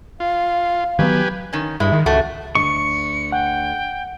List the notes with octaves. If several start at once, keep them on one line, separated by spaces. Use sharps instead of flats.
F4 F5
D#3 F#3 B3 G4 B4 G#5
D#3 C#4
G2 G#3 E4
D#3
C#2 A3 F#4
D2 D3 D#5 C#6 C#7
F#5 G5